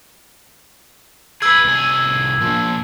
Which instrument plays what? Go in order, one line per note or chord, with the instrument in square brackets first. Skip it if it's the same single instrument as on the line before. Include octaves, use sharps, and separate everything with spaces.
[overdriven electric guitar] G#4 B4 [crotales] E6 G#6
[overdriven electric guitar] C2 G#4
A#2 F3